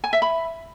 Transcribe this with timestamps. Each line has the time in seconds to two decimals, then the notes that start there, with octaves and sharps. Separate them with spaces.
0.04 G#5
0.13 E5
0.22 B5